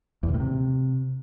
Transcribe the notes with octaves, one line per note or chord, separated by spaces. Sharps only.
E2
C3
A2
C3